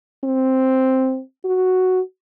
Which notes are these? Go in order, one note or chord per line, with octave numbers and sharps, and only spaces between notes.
C4
F#4